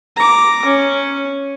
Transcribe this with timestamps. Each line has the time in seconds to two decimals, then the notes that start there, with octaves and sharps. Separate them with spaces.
0.17 A#5 D6
0.65 C#4